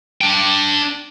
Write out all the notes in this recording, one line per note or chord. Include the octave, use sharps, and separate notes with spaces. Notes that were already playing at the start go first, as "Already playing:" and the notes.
D4 G5